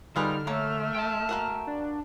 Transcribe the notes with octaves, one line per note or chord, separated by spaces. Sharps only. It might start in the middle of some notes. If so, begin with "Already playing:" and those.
D3 G3 D#4 F4 G#4 B4 F6
A3 A#3 C#5 E5
G5 A5
A#3 F#4 A#4
D4